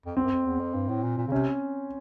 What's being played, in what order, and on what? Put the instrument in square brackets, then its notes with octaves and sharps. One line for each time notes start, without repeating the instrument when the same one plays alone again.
[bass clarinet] F2
[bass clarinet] E2 [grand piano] C4
[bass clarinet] F#2
F2
E2
F2
G2
A2
A#2
A#2
C#3
[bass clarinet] C3 [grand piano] C#4